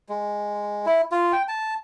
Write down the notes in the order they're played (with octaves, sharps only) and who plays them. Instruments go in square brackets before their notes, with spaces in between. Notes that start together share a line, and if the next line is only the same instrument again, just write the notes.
[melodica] G#3
E4
F4
G5
A5